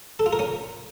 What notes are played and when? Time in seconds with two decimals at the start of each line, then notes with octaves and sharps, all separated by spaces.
0.19 A4
0.26 F4
0.33 A#4
0.39 C#4